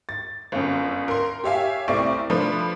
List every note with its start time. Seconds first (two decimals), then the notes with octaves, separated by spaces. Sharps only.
0.09 A6
0.52 G1 F#2
1.08 A#4 C6
1.44 G4 C#5 E5 F5 G#5
1.88 C2 A3 C4 D5 C#6 D7
2.30 F3 A3 D4 F4 B4